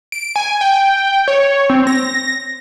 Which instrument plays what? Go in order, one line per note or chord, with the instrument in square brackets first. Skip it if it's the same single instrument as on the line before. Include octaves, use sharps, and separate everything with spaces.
[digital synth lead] D7
G#5
G5
C#5
C4
A#6